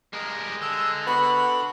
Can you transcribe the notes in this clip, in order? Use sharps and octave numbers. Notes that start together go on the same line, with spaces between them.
G2 G3 G#3 A#4
D3 E6
B2 B3 F#4 B5